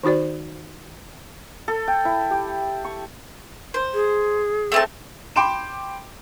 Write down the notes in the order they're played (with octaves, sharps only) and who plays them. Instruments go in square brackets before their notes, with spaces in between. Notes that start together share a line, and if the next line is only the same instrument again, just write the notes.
[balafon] D#3 D#4 F#4 C5 D5
[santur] A4
G5
E4
G4
C#6
[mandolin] C5
[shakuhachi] G#4
[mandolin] A3 C4 A5
[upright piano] G5 B5 C6 D6 D7 E7